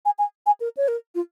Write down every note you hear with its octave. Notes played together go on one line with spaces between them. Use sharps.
G#5
G#5
G#5
A#4
C#5
A#4
F4